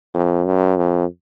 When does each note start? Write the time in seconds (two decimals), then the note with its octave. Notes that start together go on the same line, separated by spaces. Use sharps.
0.14 F2
0.45 F#2
0.77 F2